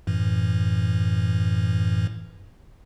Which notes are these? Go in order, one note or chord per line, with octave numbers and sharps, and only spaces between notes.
F#2 A2 E3